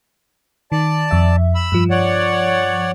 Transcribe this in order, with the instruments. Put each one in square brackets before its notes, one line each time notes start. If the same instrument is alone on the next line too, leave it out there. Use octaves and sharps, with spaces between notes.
[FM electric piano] D#3 [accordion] D5 A5
[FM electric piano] F2 E5
[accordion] B5 E6
[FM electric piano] G2 F3
[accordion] C#5 D5 F#5